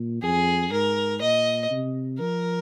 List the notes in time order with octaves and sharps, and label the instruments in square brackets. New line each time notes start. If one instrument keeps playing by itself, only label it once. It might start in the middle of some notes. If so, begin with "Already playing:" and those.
Already playing: [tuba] A#2
[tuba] F2 [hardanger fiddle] G#4
[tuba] G#2 [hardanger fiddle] A#4
[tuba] A#2 [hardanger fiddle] D#5
[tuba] C3
[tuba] F3 [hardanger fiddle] A#4